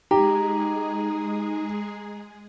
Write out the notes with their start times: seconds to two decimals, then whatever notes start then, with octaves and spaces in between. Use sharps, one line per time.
0.11 G#3 D#4 G4 G#4 A#5